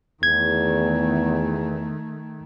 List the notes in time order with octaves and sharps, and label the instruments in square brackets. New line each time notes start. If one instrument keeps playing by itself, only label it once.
[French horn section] E2 [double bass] D#3 A3 [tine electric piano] G#6